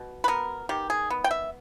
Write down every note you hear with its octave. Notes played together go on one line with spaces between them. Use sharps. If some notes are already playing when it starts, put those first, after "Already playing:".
Already playing: B2
B4
B3 A#4
D#3 G4
G#4
B3
G5
E5